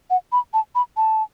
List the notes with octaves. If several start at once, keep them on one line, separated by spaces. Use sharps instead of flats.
F#5
B5
A5
B5
A5